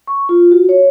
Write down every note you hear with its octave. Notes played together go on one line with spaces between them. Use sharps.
C#6
F4
F#4
C#5